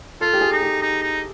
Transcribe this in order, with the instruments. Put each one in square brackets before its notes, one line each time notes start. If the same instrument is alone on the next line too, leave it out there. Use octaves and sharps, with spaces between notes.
[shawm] F4 [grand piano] A4
[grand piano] G4
G#4
[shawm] D#4
[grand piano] G4
[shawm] D#4
D#4